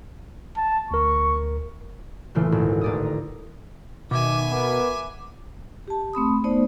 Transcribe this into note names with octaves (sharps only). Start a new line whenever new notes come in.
A5
D2 A#4 C#6
A#2 C#3 E3 A3 E4 F4
G#1 D2 A#2
A1 D5 D#6
A#5
B2 D#3 E5 G#5 D6
B3 A#4 B4 D6
G4 A5
A3 C4 B5 D#6
A3 B3 D#4 C5 D5